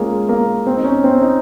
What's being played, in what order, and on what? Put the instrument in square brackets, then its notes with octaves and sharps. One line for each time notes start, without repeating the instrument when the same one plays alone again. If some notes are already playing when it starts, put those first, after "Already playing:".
Already playing: [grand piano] G#3 A#3 C#4 F4
A#3
C4
D#4
C#4
C4
D#4